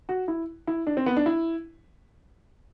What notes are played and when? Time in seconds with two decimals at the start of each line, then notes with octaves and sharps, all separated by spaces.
0.09 F#4
0.28 E4
0.67 E4
0.87 D4
0.97 C4
1.06 B3
1.17 D4
1.26 E4